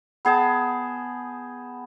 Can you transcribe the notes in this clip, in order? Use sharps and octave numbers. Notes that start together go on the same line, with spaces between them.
B3 G#4 G5 A5